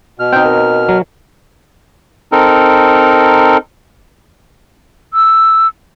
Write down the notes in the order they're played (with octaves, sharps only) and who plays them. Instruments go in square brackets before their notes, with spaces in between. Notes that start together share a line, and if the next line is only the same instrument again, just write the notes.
[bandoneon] B2 F6
[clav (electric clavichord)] C4 D#4 [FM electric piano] G5
[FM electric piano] A#4
[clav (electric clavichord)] F#3
[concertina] C4 D#4 A4 A#4
[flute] E6